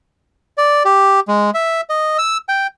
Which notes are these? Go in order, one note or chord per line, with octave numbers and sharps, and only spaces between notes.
D5
G4
G#3
E5
D#5
E6
G5